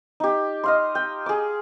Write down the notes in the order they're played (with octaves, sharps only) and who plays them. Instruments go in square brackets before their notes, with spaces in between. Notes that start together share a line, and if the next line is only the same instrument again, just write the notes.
[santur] D#4 G4
D#5 F5 C6
G5
G#4 D6